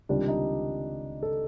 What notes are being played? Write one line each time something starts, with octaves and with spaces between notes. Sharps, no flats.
C#2 C3 D#3 G3 D4
D#4
A4